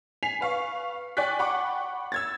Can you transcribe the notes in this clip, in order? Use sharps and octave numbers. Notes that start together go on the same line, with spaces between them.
G#5 B6 C7 F7
B4 F5 C#6
D5 G5 G#5 C#6 F#6 B6
F#5 G5 B5 C#6 D6
E6 G#6 A6